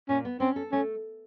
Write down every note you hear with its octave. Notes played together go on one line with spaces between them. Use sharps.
A#2 C#4
B3
C4 C#4
A4
A3 C#4